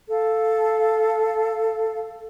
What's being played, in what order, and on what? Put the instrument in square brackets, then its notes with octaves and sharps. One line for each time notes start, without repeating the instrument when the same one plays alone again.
[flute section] A4 F5